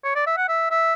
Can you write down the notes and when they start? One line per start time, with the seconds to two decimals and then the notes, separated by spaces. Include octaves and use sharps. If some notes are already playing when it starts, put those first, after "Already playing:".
0.04 C#5
0.16 D5
0.27 E5
0.37 F#5
0.49 E5
0.71 E5